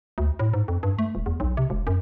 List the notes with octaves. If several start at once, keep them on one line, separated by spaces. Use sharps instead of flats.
D2
A2
G#2
F2
G2
A3
D#1
E2
B1
C3
E1
F#2